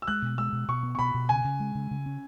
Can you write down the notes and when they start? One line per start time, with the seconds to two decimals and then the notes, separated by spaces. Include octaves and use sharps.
0.02 E6
0.08 G#3 F#6
0.22 B2
0.38 G#3 E6
0.53 B2
0.68 B2 C#6
0.83 B3
0.95 C#6
0.99 B2 B5
1.14 B2
1.29 C#3 G#5
1.44 C#3
1.60 G#3
1.75 C#3
1.91 C#3
2.06 C#4